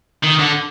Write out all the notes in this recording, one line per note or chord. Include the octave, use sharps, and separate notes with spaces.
D#3
D3